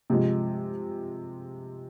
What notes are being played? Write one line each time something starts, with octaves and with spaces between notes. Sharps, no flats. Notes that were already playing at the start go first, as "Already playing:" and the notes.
C3 F3 G#3